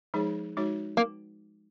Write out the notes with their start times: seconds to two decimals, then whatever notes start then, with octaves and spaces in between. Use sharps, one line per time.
0.14 F3 G#3 D#4 G#4 C#5
0.57 G#3 D#4 F#4 C#5
0.97 A#3